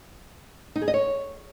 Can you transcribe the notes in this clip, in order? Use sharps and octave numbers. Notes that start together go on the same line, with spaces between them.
D#4
G#4
D#5
C#5